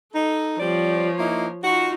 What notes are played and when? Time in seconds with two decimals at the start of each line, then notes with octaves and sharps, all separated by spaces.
0.14 D#4 A4
0.60 F3 G3 C4 C#5 D5
1.18 A#3 D#4 E4
1.63 D#4 F4 F#4